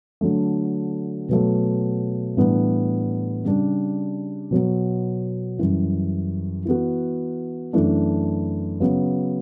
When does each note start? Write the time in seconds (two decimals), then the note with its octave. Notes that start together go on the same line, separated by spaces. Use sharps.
0.21 D3 F#3 A3
1.29 B2 F#3 A3
2.37 A2 E3 G3 B3 D4
3.44 C#3 G3 D4
4.51 B2 F#3 B3
5.58 F#2 E3 G3
6.66 E3 B3 F#4
7.73 F#2 E3 A3 D4
8.80 C#3 F#3 B3